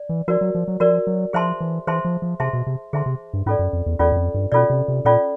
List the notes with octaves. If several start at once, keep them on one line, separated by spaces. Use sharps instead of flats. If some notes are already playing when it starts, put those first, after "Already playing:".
Already playing: D5
E3
F3 F#4 A#4 D5
F#3
F3
F#3
F3 F#4 A#4 D5
F#3
F3 G#4 C5 E5 A5 C6
E3
E3 G#4 C5 E5 A5 C6
F3
F3
C3 G#4 C5 E5 A5 C6
B2
C3
D3 G#4 C5 E5 A5 C6
C3
G2
G#2 C#4 F4 A4 D5
F#2
F2
E2
E2 C#4 F4 A4 D5
F#2
F2
G2
B2 C#4 F4 A4 D5
C3
C3
A#2 C#4 F4 A4 D5